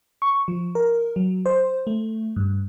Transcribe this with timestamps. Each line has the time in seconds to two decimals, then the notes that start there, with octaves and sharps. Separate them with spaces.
0.22 C#6
0.48 F3
0.75 A#4
1.16 F#3
1.46 C5
1.87 A3
2.36 G2